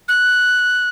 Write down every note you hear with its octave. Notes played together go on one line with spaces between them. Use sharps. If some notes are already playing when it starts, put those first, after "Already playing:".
F#6